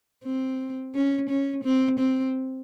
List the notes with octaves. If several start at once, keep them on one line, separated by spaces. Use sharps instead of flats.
C4
C#4
C#4
C4
C4